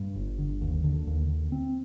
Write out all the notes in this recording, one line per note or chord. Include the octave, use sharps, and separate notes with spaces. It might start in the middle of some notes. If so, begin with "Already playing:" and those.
Already playing: G2
G1
D3
D#2
D3
D#2
D3
C4